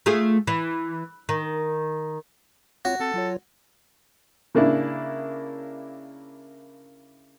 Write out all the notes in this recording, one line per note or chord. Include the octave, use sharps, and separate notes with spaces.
A3 F4 G#4
E3
D#3
C4 F4 F#4 C#5
C4 A4
F#3 F4 C#5
C#3 A#3 D4 E4